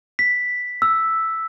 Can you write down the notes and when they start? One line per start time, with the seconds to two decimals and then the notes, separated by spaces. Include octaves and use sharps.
0.19 B6
0.82 E6